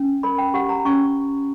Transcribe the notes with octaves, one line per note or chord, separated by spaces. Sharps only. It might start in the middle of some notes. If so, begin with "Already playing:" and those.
Already playing: C#4
A#4 B5
G5
G4 F#5
A#5
C#4 C#6